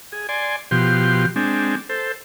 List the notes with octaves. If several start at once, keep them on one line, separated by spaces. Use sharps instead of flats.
G#4
D5 G#5 C6
B2 F3 G4 C6
G#3 C4 D4
A4 C5